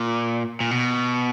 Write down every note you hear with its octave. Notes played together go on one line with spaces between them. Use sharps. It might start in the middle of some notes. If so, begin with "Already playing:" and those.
Already playing: A#2
A#2
B2